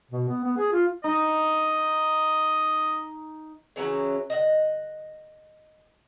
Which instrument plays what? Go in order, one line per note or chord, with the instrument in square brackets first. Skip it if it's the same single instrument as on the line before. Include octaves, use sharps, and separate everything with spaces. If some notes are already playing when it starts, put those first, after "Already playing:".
[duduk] B2
B3
B3
G#4
F4
[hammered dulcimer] D#4 [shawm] D#5
[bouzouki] C#3 E3 F#3 C#4
D#5 E5 F#5